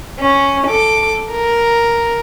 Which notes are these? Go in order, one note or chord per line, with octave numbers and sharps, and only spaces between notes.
C#4
A4 D6
A#4